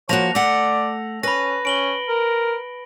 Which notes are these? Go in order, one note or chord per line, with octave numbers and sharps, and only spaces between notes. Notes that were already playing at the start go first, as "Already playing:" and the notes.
F3 A#3 F#4 C#5 A5 A#6 F7
A3 D5 F#5
C#4 B4 B5 A#6
C#4 D7 F#7 G7
A#4